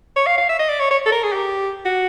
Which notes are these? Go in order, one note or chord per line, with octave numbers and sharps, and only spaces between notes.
C#5
F5
F5
E5
D#5
D5
C#5
C#5
A4
A#4
G#4
G4
F#4